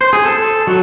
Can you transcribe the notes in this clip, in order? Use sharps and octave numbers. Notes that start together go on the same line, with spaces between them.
C5
G#4
A4
F#3